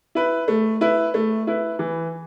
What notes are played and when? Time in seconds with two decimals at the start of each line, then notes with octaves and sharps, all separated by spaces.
0.15 E4 B4
0.48 A3
0.81 E4 B4
1.14 A3
1.47 E4 B4
1.79 E3